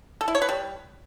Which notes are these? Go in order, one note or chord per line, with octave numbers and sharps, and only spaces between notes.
A4
E4
C#5
B4
G3